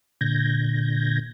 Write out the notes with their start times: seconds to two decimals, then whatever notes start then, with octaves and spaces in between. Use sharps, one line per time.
0.21 A#2 D3 G6 G#6 A#6